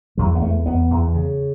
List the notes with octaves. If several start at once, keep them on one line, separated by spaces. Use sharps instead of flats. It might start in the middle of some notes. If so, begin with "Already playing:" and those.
E2 F#3
B3
E2 A3
E2 B3
E2
C#3